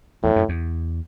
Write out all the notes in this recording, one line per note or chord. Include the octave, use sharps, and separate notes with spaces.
E2 A2
F#2
E2